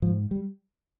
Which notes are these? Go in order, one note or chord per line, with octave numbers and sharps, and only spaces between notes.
G#2 F3
G3